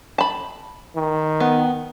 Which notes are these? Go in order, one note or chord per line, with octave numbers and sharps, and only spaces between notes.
A5 B5
D#3
B3